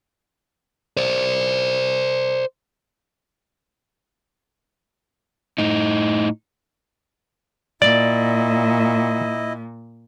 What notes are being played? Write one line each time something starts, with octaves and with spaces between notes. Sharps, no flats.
C5 D5
A2 D#4
A#2 E4 D5 D#5